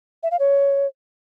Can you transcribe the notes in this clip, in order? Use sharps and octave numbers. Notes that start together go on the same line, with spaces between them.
E5
F5
C#5